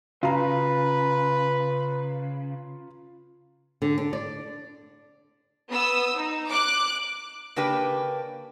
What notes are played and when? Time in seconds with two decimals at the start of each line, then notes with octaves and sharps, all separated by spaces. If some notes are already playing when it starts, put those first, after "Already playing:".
0.23 C#3 F4 B4 A#5
3.82 D3
3.98 D4
4.13 D5
5.71 B3 D#6 E6
6.18 D#4
6.50 D6 F#6
7.56 C#3 A#3 D4 G4 B4